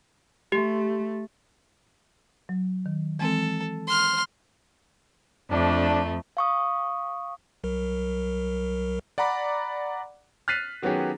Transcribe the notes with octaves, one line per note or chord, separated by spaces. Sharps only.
A3 G4
F#3
D#3
E3 G#3 C4 A4
C6 F6
F2 A3 D4
F5 C#6 D#6
C2 F#3 A#4
D5 F#5 A#5 B5 D6
F6 F#6 A6 B6 C7 D#7
D#3 F#3 B3 C#4 G4 G#4